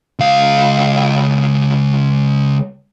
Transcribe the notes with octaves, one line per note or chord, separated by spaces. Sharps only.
C#2 F5